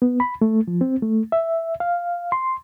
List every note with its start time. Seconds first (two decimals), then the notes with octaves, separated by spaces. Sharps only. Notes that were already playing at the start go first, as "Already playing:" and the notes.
0.02 B3
0.20 B5
0.41 A3
0.68 F3
0.81 C4
1.02 A3
1.32 E5
1.80 F5
2.32 C6